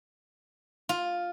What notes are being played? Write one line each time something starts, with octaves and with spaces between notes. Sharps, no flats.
F4